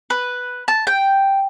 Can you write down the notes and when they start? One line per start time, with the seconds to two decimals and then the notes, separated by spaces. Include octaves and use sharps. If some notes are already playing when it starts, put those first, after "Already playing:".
0.10 B4
0.68 A5
0.87 G5